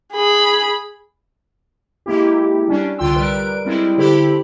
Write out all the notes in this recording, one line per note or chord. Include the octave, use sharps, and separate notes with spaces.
G#4 B5
G#3 A#3 E4 G4
G3 C#4 D4
C2 D3 F4 G5 C6 E6
G3 A#4 B4 D7
G3 G#3 C4 E4
D3 E4 G4 A4 C5 B5